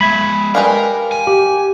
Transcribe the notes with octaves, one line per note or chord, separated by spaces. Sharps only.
G#3 E5 B5 G#6
G3 G#3 A#4 B4 F5
G#5
G4